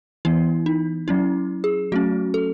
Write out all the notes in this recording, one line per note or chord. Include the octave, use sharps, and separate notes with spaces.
E3 B3 E4
D#4
F#3 C#4 E4
G#4
F#3 A3 C#4 F#4
A4